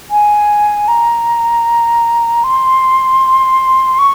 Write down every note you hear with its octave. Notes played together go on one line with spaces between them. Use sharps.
G#5
A#5
C6
C#6